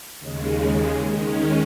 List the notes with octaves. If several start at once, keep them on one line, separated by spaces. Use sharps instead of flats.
D#2 C#3 G#3
D#3 G#3 C#4